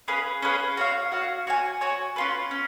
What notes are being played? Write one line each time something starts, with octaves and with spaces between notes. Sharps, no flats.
C#4 G#4 B4 F5
C#4 G#4 B4 F5
F#4 C#5 F5
F#4 C#5 F5
F#4 C#5 G#5
F#4 C#5 G#5
C#4 F4 B4
C#4